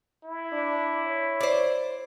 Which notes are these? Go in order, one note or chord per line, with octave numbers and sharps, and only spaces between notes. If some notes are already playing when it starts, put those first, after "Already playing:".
E4
D4
C#5
C5 D5